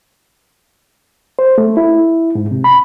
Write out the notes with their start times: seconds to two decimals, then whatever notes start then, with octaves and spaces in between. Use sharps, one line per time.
1.39 C5
1.58 A3
1.77 E4
2.35 G#2
2.51 C3
2.64 B5